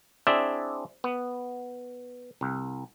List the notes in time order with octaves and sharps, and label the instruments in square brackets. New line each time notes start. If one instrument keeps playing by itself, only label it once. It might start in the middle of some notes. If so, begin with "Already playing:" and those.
[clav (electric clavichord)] C4 D4 E4 G#4 D5 E5
B3
C2